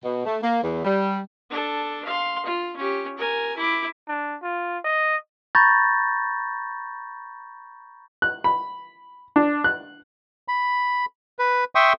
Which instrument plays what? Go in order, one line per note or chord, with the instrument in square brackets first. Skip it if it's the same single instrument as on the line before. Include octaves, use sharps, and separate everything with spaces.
[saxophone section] B2
A3
A#3
E2
G3
[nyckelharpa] D4 A4
F5 C6
F4
C#4 G4
A#4 G#5
E4 D6
[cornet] D4
F4
D#5
[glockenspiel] A#5 B5 C#6 G6 A6 A#6
[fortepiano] F#6
B5
D4
F#6
[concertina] B5
B4
E5 G5 C6 C#6 D#6